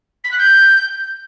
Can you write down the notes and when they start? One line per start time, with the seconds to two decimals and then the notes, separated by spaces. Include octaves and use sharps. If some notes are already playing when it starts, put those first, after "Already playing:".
0.24 B6
0.31 F#6
0.38 G6